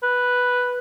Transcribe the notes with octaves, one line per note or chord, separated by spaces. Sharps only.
B4